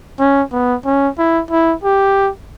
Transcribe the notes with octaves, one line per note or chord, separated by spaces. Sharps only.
C#4
B3
C#4
E4
E4
G4